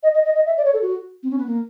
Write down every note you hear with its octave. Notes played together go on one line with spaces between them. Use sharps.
D#5
D#5
D#5
D#5
E5
D5
C#5
A4
F#4
C4
C#4
B3
A#3